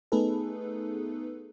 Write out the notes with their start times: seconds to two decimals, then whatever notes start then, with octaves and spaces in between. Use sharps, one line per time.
0.12 A3 B3 D#4 G#4 A4 B4